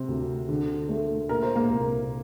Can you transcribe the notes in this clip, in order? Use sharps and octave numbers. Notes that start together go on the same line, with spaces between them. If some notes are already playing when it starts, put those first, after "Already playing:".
Already playing: C3 C4
D2
D3
A3
A#2 A#4
C5
A#3 A#4
C2